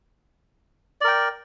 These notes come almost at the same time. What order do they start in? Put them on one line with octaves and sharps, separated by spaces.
D5 A#4 G5